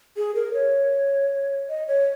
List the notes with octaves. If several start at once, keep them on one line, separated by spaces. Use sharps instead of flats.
G#4
A#4
C#5
D#5
C#5